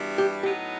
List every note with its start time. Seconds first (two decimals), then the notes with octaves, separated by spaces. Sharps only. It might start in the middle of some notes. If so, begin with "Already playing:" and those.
Already playing: G2 E3 G3 B3 F#4
0.18 G4
0.43 A2 F#3 B3 D#4 G4